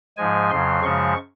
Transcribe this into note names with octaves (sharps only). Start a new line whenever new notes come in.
G#2 F3 G#3 G#5
F2 C#3 F#3 C6
F#2 C#3 F3 G#3 C#6